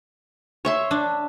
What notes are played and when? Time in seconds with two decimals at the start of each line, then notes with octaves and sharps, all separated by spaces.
0.65 C#5 E5 C6
0.91 D4